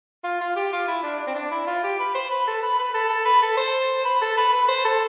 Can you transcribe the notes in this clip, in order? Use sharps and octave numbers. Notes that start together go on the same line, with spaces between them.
F4
F4
G4
F4
E4
D4
D4
C4
D4
E4
F4
G4
B4
C5
B4
A4
B4
B4
A4
A4
B4
A4
C5
B4
A4
B4
B4
C5
A4